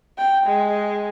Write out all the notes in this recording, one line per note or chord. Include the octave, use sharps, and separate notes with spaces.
G5
G#3